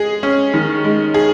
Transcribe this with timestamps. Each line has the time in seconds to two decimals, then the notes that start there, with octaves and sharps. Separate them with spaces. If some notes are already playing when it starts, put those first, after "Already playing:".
Already playing: G#3 G#4
0.23 C#4
0.54 D#3
0.84 G#3
1.14 G#4